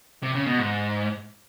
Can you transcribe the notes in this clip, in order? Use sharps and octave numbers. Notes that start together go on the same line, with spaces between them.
C3
C#3
B2
G#2